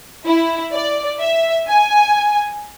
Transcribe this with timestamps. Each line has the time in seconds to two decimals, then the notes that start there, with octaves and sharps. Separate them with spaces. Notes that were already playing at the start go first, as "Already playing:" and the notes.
0.26 E4
0.72 D5
1.19 E5
1.67 G#5